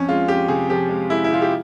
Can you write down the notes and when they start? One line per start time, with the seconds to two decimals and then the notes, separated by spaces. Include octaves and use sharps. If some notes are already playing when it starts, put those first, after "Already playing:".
Already playing: F2 C#4
0.08 G#3 F4
0.28 F2 G4
0.48 C3 G#4
0.69 F3 G4
0.89 G#3
1.10 G#3 E4
1.24 E4
1.31 C3 F4
1.42 G4